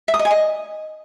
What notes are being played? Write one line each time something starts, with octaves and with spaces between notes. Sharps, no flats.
E5
D#6
D#5
G#5
D#5